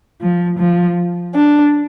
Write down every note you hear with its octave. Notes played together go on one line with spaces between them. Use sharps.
F3
F3
D4